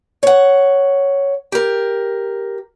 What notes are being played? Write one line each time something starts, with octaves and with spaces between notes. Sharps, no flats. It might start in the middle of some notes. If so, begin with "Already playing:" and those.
C#5 F#5
G4 A#4